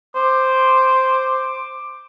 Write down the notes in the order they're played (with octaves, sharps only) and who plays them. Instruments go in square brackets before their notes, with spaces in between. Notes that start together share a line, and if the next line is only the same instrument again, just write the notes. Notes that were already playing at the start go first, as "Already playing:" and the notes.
[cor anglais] C5 [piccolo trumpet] D6